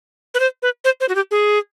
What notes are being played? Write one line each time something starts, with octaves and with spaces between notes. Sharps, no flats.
B4
C5
B4
C5
C5
F#4
G4
G#4